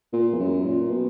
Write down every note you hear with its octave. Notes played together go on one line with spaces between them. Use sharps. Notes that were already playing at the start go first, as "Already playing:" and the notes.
A#2
E2
F#2
A#2
B2